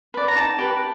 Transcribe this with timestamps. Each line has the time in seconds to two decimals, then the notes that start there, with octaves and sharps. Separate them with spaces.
0.14 B4 D5
0.28 A#5
0.35 D#4 A5
0.58 G4 B4